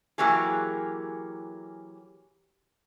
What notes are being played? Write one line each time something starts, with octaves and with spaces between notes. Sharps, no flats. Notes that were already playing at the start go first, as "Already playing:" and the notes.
E3 F#3 A#3 G4 G#4